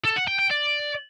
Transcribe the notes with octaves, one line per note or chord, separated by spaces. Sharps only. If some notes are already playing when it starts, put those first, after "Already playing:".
A4
F#5
G5
G5
D5